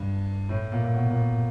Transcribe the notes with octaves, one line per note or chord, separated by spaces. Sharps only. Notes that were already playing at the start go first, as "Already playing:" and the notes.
Already playing: G2
A2
A#2
A#2
B2
A#2
B2